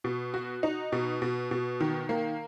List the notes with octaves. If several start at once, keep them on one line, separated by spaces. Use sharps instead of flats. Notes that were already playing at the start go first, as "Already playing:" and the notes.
B2
F#4
D#4
B2
B2
B2
D#3
A#3